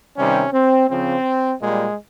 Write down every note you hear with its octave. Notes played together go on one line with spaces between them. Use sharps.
C3 D#3 G3 C#4
C4
C#3 F3 C4
A#2 G3 G#3